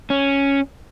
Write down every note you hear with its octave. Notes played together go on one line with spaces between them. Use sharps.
C#4